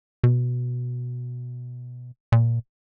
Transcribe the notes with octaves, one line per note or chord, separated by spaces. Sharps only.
B2
A#2